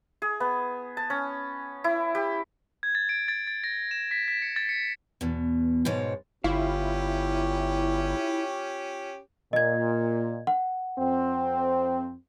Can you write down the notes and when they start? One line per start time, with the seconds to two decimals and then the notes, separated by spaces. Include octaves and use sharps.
0.22 G#4
0.40 B3
0.97 A5
1.10 C#4
1.84 E4
2.15 G4
2.83 G#6
2.95 A6
3.09 D7
3.28 A6
3.47 A6
3.64 A#6
3.91 E7
4.11 B6
4.28 B6
4.42 C#7
4.56 A6
4.69 C#7
5.21 E2 B2
5.85 G#2 B2 G#3 C#5
6.44 G1 C#4 E4 F4 G4 F5
9.53 A#2 D#5 G#6
10.47 F#5
10.98 F2 C4